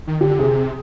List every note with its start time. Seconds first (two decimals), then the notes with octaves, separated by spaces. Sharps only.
0.07 D#3
0.21 D3 G4
0.39 C3 G#4